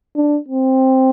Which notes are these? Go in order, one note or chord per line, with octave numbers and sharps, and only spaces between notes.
D4
C4